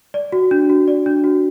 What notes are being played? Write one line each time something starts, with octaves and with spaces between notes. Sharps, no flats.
D5
F#4
D4
F#4
D5
D4
F#4